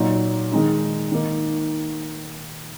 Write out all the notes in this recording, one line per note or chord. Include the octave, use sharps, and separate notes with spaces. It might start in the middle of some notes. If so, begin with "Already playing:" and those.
Already playing: A#2 F#3 D#4
D#3 G#3 D#4
D#3 A#3 D#4